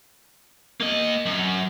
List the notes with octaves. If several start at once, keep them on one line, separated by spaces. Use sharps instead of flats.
A#3 D#5
F#2